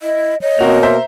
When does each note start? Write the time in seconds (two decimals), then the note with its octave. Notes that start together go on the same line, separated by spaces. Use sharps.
0.01 E4 D#5
0.41 C#5 D#5
0.59 B2 A#3 C4 F#4 A#4 F7
0.83 C5 E5 A#5